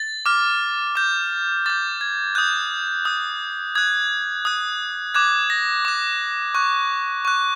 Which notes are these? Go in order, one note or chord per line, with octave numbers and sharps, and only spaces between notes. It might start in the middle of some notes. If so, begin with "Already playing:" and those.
Already playing: A6
D6 F6
D6 G6
D6 G6 A6
G#6
D#6 F#6 G6
D#6 F#6
D#6 F#6 G#6
D#6 F#6
D6 F#6 G#6
A#6
D6 F#6
C#6 F#6
C#6 F#6